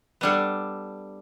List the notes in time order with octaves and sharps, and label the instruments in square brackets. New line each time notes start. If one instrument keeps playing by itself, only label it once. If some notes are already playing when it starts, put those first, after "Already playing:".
[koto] G3 B3 D4 A4